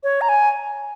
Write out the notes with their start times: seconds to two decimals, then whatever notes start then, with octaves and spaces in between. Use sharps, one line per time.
0.04 C#5
0.21 A#5
0.29 G#5